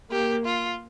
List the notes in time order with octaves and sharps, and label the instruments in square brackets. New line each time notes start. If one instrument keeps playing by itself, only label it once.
[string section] A#3 [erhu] G4
[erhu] F4